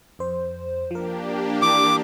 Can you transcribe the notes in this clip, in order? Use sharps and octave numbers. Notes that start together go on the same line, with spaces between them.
F2 C5
F3 A#3 D4 G4 A#4
E3 D6 D#6